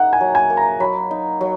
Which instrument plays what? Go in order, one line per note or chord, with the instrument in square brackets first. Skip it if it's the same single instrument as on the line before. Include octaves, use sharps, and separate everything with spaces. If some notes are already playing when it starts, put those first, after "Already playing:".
Already playing: [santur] A#3 D#4 [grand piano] F#5
[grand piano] G#5
[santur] F#3
[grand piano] G#5
[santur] A#3
[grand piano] A#5
[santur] F#3 [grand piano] B5
[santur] D#4
F#3